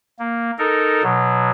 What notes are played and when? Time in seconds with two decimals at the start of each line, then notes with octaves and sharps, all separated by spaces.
0.19 A#3
0.58 D#4 A4 A#4
1.03 B2 F#3